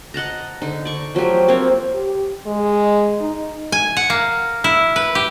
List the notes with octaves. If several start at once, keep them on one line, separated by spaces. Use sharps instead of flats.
D#5 F#5 A5 A#5
D3 D#4
D5 C#6
F3 F#3 A3 G4
A#3 C4 D4 C#5
G4
G#3
D#4
G#5
F#5
A#3
E4
B4
G4